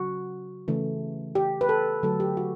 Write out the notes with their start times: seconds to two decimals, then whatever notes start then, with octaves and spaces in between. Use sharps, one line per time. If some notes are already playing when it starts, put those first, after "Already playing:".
Already playing: C#3 F#3 F#4
0.68 C#3 E3 A3
1.35 G4
1.61 B4
1.69 A4
2.03 D3 F#3 A3 A4
2.20 G4
2.37 F#4